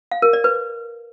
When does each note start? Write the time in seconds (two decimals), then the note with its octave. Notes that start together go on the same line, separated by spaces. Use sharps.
0.11 F5
0.22 A#4
0.33 D5
0.44 B4